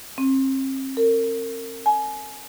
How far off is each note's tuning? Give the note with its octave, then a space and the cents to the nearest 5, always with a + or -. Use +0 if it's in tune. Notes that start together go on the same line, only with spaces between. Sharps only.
C4 +35
A#4 -35
G#5 +30